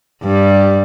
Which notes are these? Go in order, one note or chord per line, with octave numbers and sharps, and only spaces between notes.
G2 G3